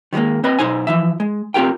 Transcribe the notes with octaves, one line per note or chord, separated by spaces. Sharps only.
D#3 E3 G3 G#3 A#3
C4 B4 D#5 B5
B1 B2 D#4 C5 G#5
E3 F3 E5
G#3
C4 F4 G4 A#4 G5